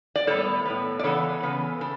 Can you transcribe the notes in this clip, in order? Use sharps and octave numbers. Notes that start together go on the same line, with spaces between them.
D5
A2 G3 B3 A4 C#5
A2 G3 B3
D5
C#3 E3 B3 A4 C#5
C#3 E3 B3
C#3 A4